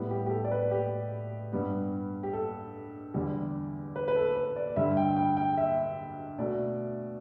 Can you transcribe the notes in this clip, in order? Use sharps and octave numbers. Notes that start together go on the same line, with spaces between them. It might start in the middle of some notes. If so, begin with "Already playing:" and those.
Already playing: A2 G3 B3
G4
G4
A4
D5
B4
G4
G2 G3 B3
G4
A4
E2 D3 G3
B4
B4
A4
B4
D5
G2 D3 G3 E5
G5
G5
G5
E5
B2 A3 D5